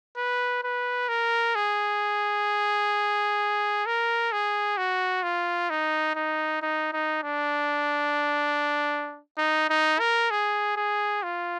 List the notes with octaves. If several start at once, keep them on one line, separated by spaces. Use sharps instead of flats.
B4
B4
A#4
G#4
A#4
G#4
F#4
F4
D#4
D#4
D#4
D#4
D4
D#4
D#4
A#4
G#4
G#4
F4